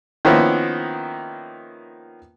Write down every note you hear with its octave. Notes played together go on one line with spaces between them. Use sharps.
D#3 F3 A#3 B3 C#4 E4